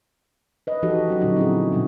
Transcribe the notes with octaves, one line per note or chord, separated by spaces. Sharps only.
B4 D#5
E3 F3 D#4 F#4 G4 A4
F#3 C#4 F#4
A#2 D3 D#4 D5
C4 E4 G#4
B2 G3 D#4